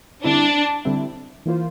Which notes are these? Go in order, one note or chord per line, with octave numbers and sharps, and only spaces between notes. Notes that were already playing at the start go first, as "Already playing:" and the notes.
D3 G3 C4 D4 E4
D3 G3 C4 E4
E3 A#3 F4 C5